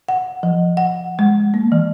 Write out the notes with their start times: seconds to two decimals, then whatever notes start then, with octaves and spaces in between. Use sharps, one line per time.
0.09 F#5
0.43 F3
0.77 F#5
1.19 G#3
1.54 A#3
1.72 E3